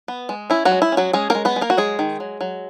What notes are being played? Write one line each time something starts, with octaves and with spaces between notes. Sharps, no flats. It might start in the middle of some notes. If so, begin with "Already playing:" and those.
B3
G#3
C#4 E4
F#3 F#4
G#3
E4
C#4
F#3 F#4
G#3 C#4 G#4
G#3 A#3 A#4
B3 B4
G#3
A#3 A#4
F#4
F#3 G#3 G#4
D#3
F#3
F#3